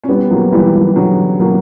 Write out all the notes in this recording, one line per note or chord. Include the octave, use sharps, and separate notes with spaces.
C#4
G3 B3
F#3 A#3
E3 G3
E3 G3
D3 F#3
F#3 A#3